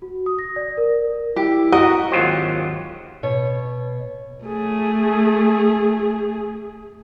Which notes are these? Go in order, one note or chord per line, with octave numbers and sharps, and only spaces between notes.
F#4
D#6
A#6
D5
A#4
E4 G4
F#4 A#4 D#5
G#1 D#2 F#3 F4 G4 C5
B2 C#5
A3 G#4